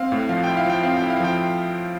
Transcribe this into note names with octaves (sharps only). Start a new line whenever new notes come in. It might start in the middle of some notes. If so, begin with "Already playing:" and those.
Already playing: C4 F5
A2
F3 F5
E4 G5
F5
F3 G5
C4 F5
G5
E4
F5
F3 G5